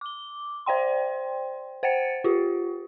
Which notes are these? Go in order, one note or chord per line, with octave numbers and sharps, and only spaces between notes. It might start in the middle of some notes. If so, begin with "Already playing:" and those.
D6 G7
C5 D5 G5 C6
C5 F#5 G5 A6 C#7
F4 G4